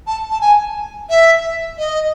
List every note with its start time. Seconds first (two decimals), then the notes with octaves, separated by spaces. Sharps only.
0.07 A5
0.30 A5
0.41 G#5
1.09 E5
1.78 D#5